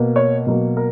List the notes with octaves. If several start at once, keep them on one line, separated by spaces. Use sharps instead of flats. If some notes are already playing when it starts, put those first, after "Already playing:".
Already playing: B2 A#3
C#5
B2 F#3 A#3
A#4